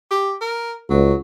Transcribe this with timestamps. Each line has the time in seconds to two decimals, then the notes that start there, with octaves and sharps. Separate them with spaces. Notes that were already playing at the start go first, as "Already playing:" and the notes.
0.11 G4
0.41 A#4
0.90 C#2 F#3